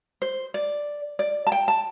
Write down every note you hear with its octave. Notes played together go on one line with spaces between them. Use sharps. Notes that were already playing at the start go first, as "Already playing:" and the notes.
C5
D5
D5
A5
G5
A5